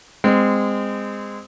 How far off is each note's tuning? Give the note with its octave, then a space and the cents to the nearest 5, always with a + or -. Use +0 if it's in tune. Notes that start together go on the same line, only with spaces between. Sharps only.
G#3 -20 C4 -20